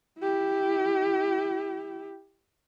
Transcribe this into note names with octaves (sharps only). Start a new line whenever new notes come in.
E4 G4